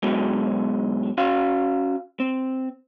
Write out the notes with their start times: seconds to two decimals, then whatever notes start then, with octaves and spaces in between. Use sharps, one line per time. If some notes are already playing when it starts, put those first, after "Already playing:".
0.03 G#2 B2 D3 F#3 G#3
1.18 C#4 F#4 F5
2.20 C4